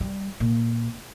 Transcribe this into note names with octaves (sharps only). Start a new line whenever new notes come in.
G3
A#2